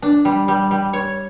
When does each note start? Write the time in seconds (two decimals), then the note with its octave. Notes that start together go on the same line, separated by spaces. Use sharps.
0.02 D4
0.25 G3
0.48 G3
0.71 G3
0.93 C#5